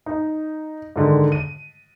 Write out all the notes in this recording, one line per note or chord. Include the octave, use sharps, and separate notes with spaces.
D#4
G#2 D3 D#3
D#7